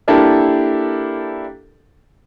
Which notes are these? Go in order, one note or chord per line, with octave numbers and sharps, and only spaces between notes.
A#3 D4 E4 G4 A4 A#4